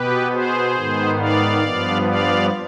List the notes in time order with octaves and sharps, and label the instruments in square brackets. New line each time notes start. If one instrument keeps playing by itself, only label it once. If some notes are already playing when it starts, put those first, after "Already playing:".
Already playing: [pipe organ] B2 B3 G4 B4
G#4 C5
G#2 D#3 B3
D5 F5
G2 F3 B3
D5 F5